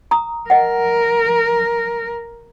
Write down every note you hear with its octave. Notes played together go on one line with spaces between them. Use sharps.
A#5 D#6
A#4 D#5 F#5